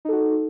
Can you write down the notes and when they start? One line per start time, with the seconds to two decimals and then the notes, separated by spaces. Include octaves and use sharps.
0.05 D#4
0.08 A4
0.12 F#4